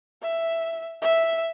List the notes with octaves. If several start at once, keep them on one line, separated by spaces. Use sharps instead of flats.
E5
E5